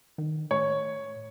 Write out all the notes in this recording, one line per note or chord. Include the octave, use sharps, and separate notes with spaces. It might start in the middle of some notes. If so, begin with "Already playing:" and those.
D#3
A2 C#5